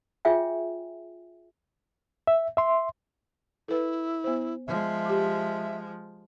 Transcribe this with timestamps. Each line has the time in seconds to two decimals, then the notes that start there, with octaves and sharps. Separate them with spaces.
0.25 F4 G#4 C#5 E5 G5 G#5
2.27 E5
2.57 E5 C6
3.68 E4 A4 B4
4.24 B3 C5
4.67 F3 G#3 E5
5.05 G4 D6